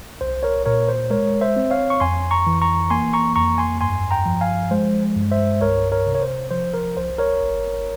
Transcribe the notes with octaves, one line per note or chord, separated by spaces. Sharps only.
C2 C5
A#4 C#5
A#2 A#4 C#5
C5
G#3 A#4 C#5
C5 E5
C4
C#5 F5
C#6
F2 G#5 C6
A#5 C#6
E3
A#5 C#6
A#3 G#5 C6
A#5 C#6
F2 A#5 C#6
G#5 C6
G2 G#5 C6
G5 A#5
F3
F5 G#5
G#3 C5
G2
C5 E5
C2 A#4 C#5
A#4 C#5
C3
C#5
C5
F3 C5
A#4
C2 C5
A#4 C#5
G#1